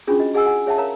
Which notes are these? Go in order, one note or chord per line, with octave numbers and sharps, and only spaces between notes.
C#4 D4 F4 F#4 G#4
F#4 D#5
F#4 G#4 D#5 F#5 G#5 E6
G#4 F#5 G#5
G#4 C#5 E5 F#5 A5
A#4 C#5 F5 A#5